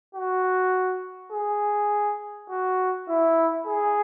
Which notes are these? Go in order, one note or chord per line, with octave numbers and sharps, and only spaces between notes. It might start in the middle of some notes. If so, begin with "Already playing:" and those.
F#4
G#4
F#4
E4
G#4